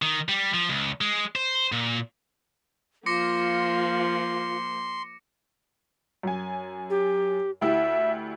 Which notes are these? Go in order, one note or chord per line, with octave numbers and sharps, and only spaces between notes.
D#3
G3
F3
C#2
G#3
C5
A#2
F3 A#3 F4 C6 D6 A#6 C#7
F#2 G#5
G4
D2 E4 G4 E5